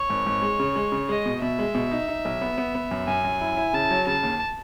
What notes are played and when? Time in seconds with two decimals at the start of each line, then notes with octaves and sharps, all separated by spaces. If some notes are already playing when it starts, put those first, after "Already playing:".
Already playing: C#5
0.10 G#1
0.26 G#1
0.42 G#3
0.59 C#3
0.76 G#3
0.92 C#3
1.09 G#3 D#5
1.26 B2
1.42 B2 E5
1.59 G#3
1.75 B2
1.91 D#4
2.08 D#4
2.25 B1
2.41 B3
2.58 B3
2.75 B3
2.91 F#2
3.07 F#2 G#5
3.24 F#2
3.41 E4
3.57 E4
3.73 C#3 A5
3.90 F#3
4.07 C#3 A5
4.23 D#2